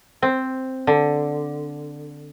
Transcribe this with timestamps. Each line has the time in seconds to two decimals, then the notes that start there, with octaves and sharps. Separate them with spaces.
0.22 C4
0.87 D3